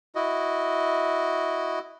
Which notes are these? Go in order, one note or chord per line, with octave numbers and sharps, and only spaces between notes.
E4 F#4 D#5